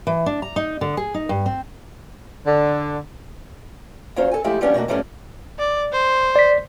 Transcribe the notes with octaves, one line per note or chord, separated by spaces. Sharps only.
E3
D4
A#5
D#4
D3
G#4
D#4
G2
C4
D3
E2 F#3 C#4 F4 C5
A4 G#5
F3 G#3 A3 E4 F4 G4
E3 F3 G3 B3 C#4 D4
B2 A3 A#3 F#4
G#2 F3 G3 A3 B3 C#4
D5
C5
D5 B6